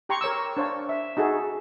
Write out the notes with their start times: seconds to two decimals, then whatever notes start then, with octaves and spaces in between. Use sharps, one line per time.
0.09 G4 G5 A#5 C6 C#6
0.21 A#4 C#5 D6 E6
0.57 D4 C5 C#5 F5 A5
0.89 E5
1.17 D#4 F#4 G#4 A4